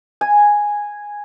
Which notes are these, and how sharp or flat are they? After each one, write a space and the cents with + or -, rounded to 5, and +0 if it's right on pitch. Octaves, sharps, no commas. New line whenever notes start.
G#5 -5